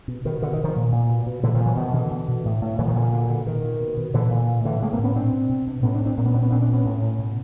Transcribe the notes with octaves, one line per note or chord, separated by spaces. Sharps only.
B2
B2 D#3
B2 D3
D#3
B2
D#3 F3
A#2
A#2
B2
B2
A#2 D3 E3
D#3 F3
A#2
E3 F#3
B2 D#3 F3
B2 D3 E3
B2
B2
A2
A2
A#2 E3 F#3
D#3 F3
A#2 D3 E3
D#3
B2 D3
B2 D3
A#2 D#3
A#2
B2
B2
A#2 D3 E3
A#2
A2
A2 D3 E3
A2 G#3 A#3
A#3 C4
A2
B3 C#4
A#2 C4 D4
A#2
B2
B2
A2 B3 C#4
C4 D4
A2
C4 D4
A#2 A#3 C4
B3 C#4
A#2 C4 D4
B3 C#4
A#2 C4 D4
C4 D4
A#2
B3 C#4
A2
A2
B2